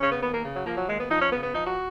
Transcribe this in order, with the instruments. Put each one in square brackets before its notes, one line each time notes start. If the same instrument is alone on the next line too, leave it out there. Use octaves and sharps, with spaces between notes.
[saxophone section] C#3 C#4
B3
D#2 B3
A#3
C#3
F#3
F3 A#3
F#3
D#2 G#3
B3
F3 D#4
C#4
C#3 B3
B3
F3 D#4
F#4